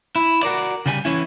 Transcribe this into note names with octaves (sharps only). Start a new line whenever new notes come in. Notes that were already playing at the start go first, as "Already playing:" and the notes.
E4
F#4 A#4 D5
C#3 G3 G#5
E3 C#4 E4